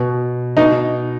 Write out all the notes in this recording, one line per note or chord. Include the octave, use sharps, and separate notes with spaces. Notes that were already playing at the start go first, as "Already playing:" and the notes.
Already playing: B2
B2 D#4